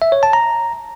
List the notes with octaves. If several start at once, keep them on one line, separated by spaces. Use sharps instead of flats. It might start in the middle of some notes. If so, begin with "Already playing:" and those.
E5
C#5
A5
A#5